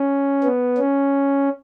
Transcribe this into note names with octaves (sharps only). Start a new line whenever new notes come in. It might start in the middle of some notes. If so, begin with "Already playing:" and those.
Already playing: C#4
B3
C#4